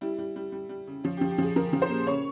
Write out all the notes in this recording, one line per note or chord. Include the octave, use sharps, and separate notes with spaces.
G3 E4
G3
G3
G3
G3
C#3
F3 C#4
F3 G4
G4
F3 G#4
F3 A#4
F3
C5
A#2
C#3 C#5